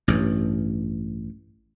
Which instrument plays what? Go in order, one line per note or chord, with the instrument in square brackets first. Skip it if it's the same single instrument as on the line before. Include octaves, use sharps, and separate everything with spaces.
[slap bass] A1 G2